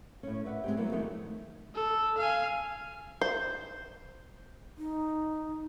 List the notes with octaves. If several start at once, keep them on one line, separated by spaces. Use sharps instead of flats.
A2 C#4
B4 D5 E5 F#5
G#3 C4 G4
E3 F#3 G#3 A#3 B3 F#4
D#3 F3 F#3 A3 D#4 E4
A4
F5 G#5
C5
D#4